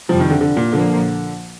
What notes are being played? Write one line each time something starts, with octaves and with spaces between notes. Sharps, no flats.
F2 C3 F3 G3
D#3
D3
D3
A#2
A#1 A#2 D3 F3 A#3